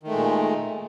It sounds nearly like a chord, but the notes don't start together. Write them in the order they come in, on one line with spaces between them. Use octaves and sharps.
D#3 A3 G#3 A#2